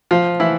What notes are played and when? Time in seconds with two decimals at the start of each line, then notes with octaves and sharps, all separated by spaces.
0.11 F3 F4
0.40 E3 E4